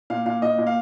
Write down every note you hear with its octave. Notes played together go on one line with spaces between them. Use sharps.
A#2 F5
A#2 F5
A#2 D#5
A#2
F5